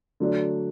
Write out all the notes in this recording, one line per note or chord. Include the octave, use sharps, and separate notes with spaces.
D3 F#3 A3 D4